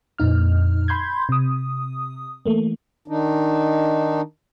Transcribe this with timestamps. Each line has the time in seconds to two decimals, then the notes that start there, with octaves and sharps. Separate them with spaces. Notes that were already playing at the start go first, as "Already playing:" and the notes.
0.18 F2 A#2 D#4 F6
0.88 B5 C6 G6 G#6
1.29 C3 D#6
2.46 E3 A3 A#3
3.08 D#3 D4 D#4